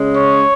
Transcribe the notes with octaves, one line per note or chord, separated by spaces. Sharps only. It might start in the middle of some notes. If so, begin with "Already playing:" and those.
Already playing: C#3 G#3 C#4
C#5